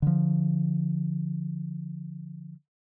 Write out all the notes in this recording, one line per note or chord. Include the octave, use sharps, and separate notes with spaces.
D3 F3